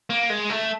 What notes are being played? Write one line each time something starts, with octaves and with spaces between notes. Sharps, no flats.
A#3
G#3
A3